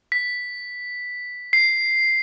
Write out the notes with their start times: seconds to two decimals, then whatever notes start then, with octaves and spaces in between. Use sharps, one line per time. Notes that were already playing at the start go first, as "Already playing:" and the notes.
0.12 B6
1.53 C7